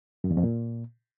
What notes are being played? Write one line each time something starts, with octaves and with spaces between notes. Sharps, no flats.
F#2
E2
F2
A#2